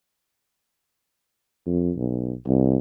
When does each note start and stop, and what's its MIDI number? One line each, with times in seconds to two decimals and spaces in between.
1.67 1.91 41
1.96 2.33 35
2.47 2.77 36